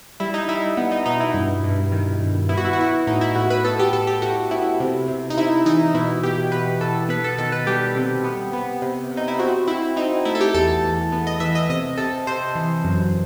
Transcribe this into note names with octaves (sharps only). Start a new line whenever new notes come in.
G3 E4
D#4
G3 E4
B3
D#4
B2 D#4
E4
G2
G2
D#3
G2
B3 E4
F#4
E4
F#4
B3 E4
A2 D#4
E4
A2 F#4
B4
B3 A4
G4
A2 A4
G4
A2 F#4
B3 E4
C3
C3
D#4
C3 E4
E3 D#4
B2 E4
B2 G4
B2 B4
B2 A4
B3 B4
A4
D#3 A4
B4
G3 G4
C3
B3
B3
C3
C3
D#4
E4
C4 F#4
C4 E4
C4 D#4
A3 E4
A4
G4
E2 A4
E2
B3
D#5
E3 E5
D#5
C3 D#5
C3 A4
C3 C5
E3
F#2